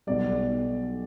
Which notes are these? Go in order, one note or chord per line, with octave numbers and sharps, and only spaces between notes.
B1 B2 G3 D5